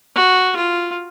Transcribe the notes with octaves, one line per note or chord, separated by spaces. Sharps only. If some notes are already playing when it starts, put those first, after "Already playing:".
F#4
F4